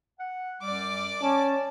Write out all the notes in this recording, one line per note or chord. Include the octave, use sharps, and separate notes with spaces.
F#5
F#2 G3 D5 D6
C#4 A5